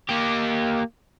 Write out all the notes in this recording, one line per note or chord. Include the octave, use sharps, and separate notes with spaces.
A#3 G4